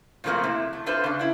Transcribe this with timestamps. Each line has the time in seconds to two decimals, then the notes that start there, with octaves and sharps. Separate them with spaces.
0.24 A#2 C#3 F3 A3 A#3 C4
0.44 C3 E4
0.73 A3
0.86 D4 F4 A4 B4 C5 E5
1.04 C#3 D4
1.19 D4 E4